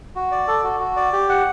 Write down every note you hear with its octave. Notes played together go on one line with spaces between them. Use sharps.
F#4
D5
A4
F#4
F#4
D5
G4
F#5